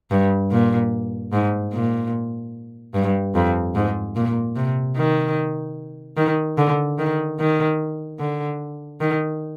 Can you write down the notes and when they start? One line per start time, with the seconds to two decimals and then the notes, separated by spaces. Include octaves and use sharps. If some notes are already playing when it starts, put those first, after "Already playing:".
0.11 G2
0.52 A#2
1.33 G#2
1.73 A#2
2.94 G2
3.35 F2
3.75 G#2
4.16 A#2
4.56 C3
4.97 D#3
6.17 D#3
6.58 D3
6.99 D#3
7.40 D#3
8.20 D3
9.01 D#3